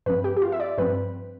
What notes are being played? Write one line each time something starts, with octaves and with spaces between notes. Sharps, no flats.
G2 F3 C4 B4
G4
G4
F4
E5
D5
G2 F3 C4 B4